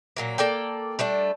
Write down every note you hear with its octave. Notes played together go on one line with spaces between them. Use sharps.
A#2 F#3 A#3
A#3 A4 D5 G5
G3 A3 D4